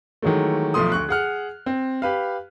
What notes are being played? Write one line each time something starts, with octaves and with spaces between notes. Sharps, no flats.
D#3 E3 F#3 G#3 A3
B1 F3 A3 C6 D#6
D2 C#6 F#6
G#4 F#5 F6
C4
G4 B4 F5